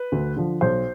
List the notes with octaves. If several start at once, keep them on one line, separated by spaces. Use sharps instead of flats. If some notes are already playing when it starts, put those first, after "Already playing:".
Already playing: B4
D2
D3 F3
B1 C5